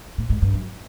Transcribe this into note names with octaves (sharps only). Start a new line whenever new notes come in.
A2
G#2
G2
F#2